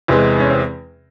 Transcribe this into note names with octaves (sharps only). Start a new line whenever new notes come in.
E2 C3 E3 G#3
C#4
C4